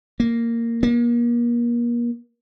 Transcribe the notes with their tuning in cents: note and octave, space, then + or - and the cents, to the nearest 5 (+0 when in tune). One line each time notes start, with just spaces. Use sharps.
A#3 -10
A#3 +35